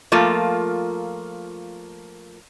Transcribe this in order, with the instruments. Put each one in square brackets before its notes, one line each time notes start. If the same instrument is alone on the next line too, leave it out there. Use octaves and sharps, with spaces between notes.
[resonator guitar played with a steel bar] F3 A3 A#3 F4